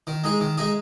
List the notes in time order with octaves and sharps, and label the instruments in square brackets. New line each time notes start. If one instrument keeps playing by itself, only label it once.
[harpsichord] D#3
G#3 D#4 G#4
D#3
G#3 D#4 G#4